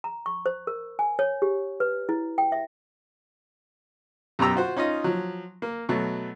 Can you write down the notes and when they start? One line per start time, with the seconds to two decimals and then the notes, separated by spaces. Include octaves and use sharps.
0.04 A#5
0.26 C#6
0.46 C5
0.67 A#4
0.99 G#5
1.19 C#5
1.42 G4
1.80 B4
2.09 E4
2.38 G5
2.52 E5
4.39 F#2 B2 G4 A#5 E6
4.55 F4 F#4 C5
4.77 C#4 D#4 F4 D#5
5.04 F3 F#3
5.62 A#3
5.89 B2 F#3 A3